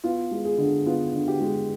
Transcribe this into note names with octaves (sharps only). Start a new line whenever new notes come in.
B3 F4
G#3
G#4
D3
B3 F4
D3
G4
G#3